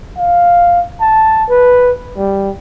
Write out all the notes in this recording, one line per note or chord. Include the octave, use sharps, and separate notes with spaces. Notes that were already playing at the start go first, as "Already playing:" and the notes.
F5
A5
B4
G3